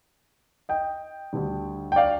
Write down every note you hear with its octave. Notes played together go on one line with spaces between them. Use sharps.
D#5 G5
D2 D3 G3
G5
D5 F5